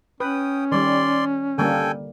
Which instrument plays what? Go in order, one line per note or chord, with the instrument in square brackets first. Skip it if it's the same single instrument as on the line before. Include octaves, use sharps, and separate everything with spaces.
[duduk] C#4 [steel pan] B4 [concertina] G5 D#6
[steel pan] D#3 G3 [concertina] D5 C6
[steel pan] D3 G3 A#3 [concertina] A4 G5 G#5